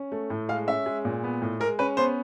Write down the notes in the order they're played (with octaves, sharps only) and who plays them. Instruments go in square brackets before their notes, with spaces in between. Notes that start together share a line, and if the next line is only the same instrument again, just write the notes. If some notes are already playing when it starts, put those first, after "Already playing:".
Already playing: [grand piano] C#4
A3
A2
G#3 F5
C#4 E5
G#3
A#2
B3
A2
G#3 A#4
C#4 B4
B3 C5